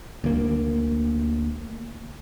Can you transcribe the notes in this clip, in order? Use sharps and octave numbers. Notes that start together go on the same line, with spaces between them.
D2 A#3